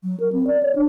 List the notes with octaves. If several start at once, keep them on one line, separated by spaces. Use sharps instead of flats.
F#3
A#4
C4
D5
C#5
D4